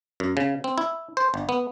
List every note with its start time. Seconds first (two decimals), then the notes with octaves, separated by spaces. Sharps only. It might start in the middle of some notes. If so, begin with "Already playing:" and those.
0.20 F#2
0.37 C#3
0.64 C4
0.78 E4
1.17 C5
1.34 G1
1.49 B3